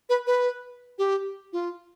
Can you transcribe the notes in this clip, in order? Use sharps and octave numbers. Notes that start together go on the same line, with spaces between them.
B4
B4
G4
F4